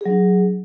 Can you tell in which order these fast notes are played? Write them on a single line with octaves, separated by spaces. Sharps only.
G#4 F#3 D4